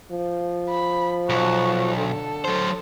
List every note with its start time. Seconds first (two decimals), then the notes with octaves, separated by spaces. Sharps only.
0.11 F3
0.70 B5
1.30 B1 F#4
1.97 D3 A4
2.45 F#3 C5